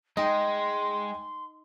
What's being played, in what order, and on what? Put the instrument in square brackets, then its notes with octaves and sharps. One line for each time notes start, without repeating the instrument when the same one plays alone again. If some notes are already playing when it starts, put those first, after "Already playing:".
[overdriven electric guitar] G#3 [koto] D#4 [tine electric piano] D#5 G5 [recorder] C6